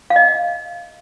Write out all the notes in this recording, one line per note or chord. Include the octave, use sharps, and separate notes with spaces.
F5
D#5